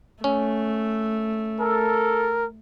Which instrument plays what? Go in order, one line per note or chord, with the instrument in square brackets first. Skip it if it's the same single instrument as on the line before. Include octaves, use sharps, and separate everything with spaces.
[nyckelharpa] A3 [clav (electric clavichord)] C#4
[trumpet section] A4 [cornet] A#4